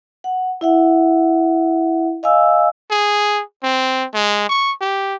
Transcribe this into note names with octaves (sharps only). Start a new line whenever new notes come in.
F#5
E4 E5 F#5
D#5 F5 G#5 E6
G#4
C4
G#3
C#6
G4